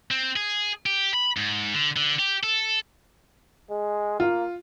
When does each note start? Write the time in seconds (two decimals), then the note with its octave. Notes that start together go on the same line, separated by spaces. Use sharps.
0.11 C4
0.36 G#4
0.86 G4
1.14 B5
1.37 G#2
1.74 D3
1.96 D3
2.19 G4
2.43 A4
3.70 G#3
4.20 A#3 F4